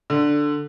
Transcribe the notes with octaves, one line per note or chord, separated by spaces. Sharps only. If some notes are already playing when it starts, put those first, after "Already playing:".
D3